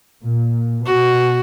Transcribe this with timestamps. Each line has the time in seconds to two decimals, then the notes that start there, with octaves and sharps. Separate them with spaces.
0.24 A#2
0.86 B2 F#4